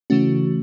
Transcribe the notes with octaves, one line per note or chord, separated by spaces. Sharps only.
C#3 E3 A3 C#4 F#4